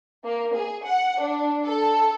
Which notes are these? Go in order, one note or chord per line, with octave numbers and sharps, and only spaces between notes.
A#3
G#4
F#5
D4
A4